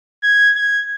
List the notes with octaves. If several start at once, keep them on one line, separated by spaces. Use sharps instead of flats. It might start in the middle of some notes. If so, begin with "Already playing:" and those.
G#6
G#6